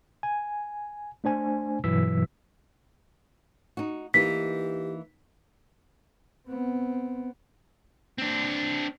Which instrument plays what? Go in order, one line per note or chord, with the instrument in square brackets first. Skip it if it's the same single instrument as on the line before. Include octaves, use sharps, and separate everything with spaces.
[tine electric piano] G#5
A3 D4 C5 G#5
G2 B2 E3 F#3 E6 B6
[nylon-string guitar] D#4 F#4
[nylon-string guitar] E3 A#3 D#4 [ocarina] G4 [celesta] B6
[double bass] B3 C4
[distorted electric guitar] C4 D4